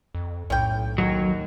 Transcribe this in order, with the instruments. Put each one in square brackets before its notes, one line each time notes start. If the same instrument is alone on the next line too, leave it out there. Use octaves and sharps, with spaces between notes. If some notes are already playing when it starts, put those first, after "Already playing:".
[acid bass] F2
[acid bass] B1 [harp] A2 [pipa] C#4 G5
[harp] D#2 G#6 [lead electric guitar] F#3